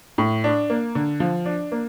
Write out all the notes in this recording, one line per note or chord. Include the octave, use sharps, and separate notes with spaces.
A2
D4
A#3
D3
F3
D4
A#3